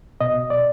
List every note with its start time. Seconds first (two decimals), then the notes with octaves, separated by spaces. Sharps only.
0.21 B2 D#5
0.50 D5